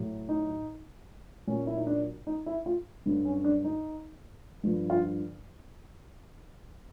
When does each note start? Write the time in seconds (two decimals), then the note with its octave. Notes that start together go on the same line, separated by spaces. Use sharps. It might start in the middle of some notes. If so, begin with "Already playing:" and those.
Already playing: A2 F#3
0.29 D#4
1.47 A#2 F#3 C#4
1.67 E4
1.77 D#4
1.87 D4
2.27 D#4
2.46 E4
2.66 F4
3.06 G2 D3 F#3
3.25 C#4
3.44 D4
3.64 D#4
4.64 G2 D3 F3
4.90 F4